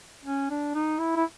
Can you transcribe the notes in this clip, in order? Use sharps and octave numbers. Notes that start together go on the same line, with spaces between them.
C#4
D4
D#4
E4
E4